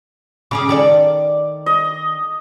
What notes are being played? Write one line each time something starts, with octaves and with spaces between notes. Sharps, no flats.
C#3 C#4 G#4 D6
D#3 A4 D5
D#5